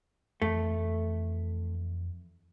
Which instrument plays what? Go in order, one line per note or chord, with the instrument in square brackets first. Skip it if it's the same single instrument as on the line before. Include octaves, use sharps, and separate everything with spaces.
[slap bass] F2 E3 [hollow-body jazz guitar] A3